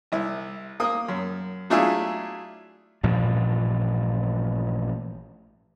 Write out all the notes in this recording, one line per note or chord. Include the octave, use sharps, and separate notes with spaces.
C2 E4
A#3 D#6
F#2
F#3 A3 D4 E4 F4 G#4
A1 G2 A#2 F3